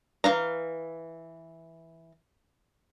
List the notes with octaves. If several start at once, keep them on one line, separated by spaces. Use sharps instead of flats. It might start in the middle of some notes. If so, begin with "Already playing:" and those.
E3 F3 F5 A#5